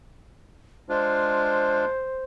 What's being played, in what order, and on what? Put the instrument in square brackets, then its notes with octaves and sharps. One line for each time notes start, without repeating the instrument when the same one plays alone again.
[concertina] G#3 D4 F4 [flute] C5